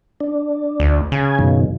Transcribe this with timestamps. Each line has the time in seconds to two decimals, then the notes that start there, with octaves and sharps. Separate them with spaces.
0.20 D4
0.80 D2
1.12 C#3 G#5
1.39 F#2 B2 D#3